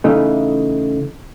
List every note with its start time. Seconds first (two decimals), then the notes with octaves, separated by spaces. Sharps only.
0.04 C#3 E3 A3 D#4